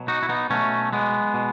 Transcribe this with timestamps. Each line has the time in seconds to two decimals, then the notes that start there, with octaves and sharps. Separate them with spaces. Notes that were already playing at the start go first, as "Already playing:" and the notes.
Already playing: B2 F#3
0.08 D#4 F#4
0.23 E4
0.29 B3 D#4
0.50 B2 F#3 A3 C#4
0.93 G#3 B3
1.34 B2